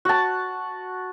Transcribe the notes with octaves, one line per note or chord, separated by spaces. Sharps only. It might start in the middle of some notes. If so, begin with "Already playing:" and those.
F#4 A5